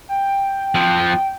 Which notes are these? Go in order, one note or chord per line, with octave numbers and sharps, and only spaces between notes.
G5
F2 F3